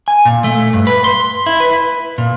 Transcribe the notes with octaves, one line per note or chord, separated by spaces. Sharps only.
G#5
A#2
A3
G2
B4
C6
E4
B4
A#2